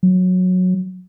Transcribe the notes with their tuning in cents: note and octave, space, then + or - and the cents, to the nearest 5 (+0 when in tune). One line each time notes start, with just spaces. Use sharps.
F#3 -15